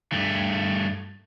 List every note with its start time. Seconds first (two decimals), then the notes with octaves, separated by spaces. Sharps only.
0.12 G2 A3